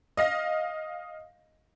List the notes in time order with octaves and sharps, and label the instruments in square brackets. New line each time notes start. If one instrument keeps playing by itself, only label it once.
[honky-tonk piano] D#5 F5 A#6